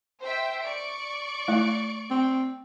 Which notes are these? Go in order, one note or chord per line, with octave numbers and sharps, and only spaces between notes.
C5 E5 G5
D5 C#6 D7
A3 E4
C4